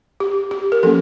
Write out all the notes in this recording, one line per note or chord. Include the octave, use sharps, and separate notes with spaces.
G4
G4
A#4
F3 A#3 C#4 A4